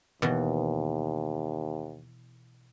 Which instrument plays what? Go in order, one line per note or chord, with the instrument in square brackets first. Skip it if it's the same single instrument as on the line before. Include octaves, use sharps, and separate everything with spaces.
[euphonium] D#2 [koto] B2 E3